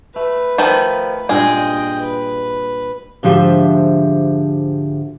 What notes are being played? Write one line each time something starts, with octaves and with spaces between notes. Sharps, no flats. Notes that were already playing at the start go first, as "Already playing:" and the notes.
A3 B4
D#3 F3 A3
G2 A#2 G#3 D#5 G5
B4
G#2 D3 F3 G4 E5